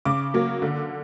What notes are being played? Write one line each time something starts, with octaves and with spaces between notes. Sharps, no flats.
C#3 D6
F#3 A#3
D3